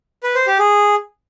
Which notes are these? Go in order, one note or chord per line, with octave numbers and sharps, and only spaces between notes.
B4
C5
G4
G#4